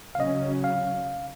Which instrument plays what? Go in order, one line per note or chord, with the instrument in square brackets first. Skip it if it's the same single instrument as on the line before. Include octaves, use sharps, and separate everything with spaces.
[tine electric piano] F5
[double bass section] C#3 F#3 C#4 [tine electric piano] D#5
[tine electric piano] F5